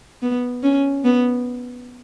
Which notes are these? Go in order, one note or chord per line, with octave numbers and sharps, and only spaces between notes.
B3
C#4
B3